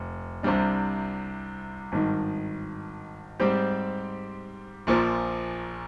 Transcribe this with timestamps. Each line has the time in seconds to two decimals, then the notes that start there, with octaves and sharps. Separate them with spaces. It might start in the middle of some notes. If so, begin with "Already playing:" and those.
Already playing: F1
0.43 C2 C3 G3 D4
1.92 G#1 G2 D#3
3.40 G#2 G3 C4 G4 C5
4.87 A#1 A#2 F3